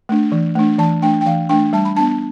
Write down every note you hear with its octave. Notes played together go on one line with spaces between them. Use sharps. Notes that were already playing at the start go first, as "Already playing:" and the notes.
A3 D4
E3
A3 D4
E3 A5
A3 D4 G5
G5
E3 F5
A3 D4 G5
G3 A5
B5
B3 D4 A5